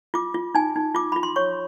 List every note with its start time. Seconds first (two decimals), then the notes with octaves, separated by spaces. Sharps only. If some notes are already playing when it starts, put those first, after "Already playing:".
0.14 F4 D6
0.34 F4
0.55 D#4 G#5
0.76 D#4
0.95 F4 D6
1.12 F4 B5
1.23 C6
1.36 C#5 C#6